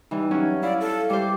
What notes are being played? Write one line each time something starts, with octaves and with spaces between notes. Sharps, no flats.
E3 G3 D#4
F#3 C#4
E4 D5 F5
A4
G3 C5 D6